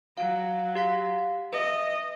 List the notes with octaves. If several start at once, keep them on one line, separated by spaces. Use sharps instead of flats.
F#3 F5
G4 F5 B6
B4 D#5 E5